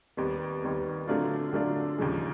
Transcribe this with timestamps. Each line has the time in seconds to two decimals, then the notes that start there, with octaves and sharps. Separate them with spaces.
0.17 D#2 D#3 G3 B3
0.62 D#2 D#3 G3 B3
1.07 D3 F#3 A3 D4 F4
1.53 D3 F#3 A3 D4 F4
1.98 D#2 C#3 F3 G#3